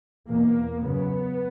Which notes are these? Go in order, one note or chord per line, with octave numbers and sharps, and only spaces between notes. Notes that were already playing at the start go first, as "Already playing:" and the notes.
E2 B2 A#3
F#2 C#3 B3